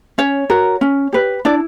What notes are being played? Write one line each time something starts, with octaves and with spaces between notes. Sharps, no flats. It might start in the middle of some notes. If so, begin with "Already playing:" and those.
C#4 C#5
F#4 A#4
C#4
G4 B4
D4 E4 D5